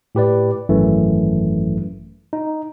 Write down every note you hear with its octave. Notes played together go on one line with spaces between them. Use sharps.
A2 G4 B4 D5
G#1 F#2 E3 A3
D#4